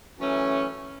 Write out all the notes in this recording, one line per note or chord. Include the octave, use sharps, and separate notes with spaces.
F#2 E3 A3 C#4